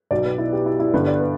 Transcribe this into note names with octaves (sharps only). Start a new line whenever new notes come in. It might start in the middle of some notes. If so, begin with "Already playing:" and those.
B1 B2 D5
B4
E4
G4
E4
E4
G1 G2 D3 B4
D5
B4